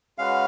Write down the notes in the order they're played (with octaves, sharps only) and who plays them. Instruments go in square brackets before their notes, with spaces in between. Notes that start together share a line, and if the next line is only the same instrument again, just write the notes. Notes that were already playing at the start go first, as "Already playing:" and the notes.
[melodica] G#3 C#4 F#4 B4 [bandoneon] F5